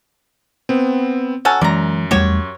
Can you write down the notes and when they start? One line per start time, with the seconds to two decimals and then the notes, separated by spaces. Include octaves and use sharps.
0.69 B3 C4
1.45 F#3 C#4 A4 F#5 G#5
1.61 F#2 E3 G#3 D5 A#5
2.11 E2 G3 A3 F#4 G4 C#5